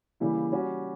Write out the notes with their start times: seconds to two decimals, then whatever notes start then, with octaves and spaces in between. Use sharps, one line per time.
0.20 C#3 E3 G3 A#3 E4
0.52 G3 C#4 F#4